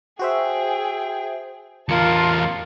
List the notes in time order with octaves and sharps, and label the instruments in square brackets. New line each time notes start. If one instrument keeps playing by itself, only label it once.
[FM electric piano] F#4 C5 E5 [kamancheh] G#4 G5
[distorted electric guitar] E2 A#4 [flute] F4 [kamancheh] A5 [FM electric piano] C#7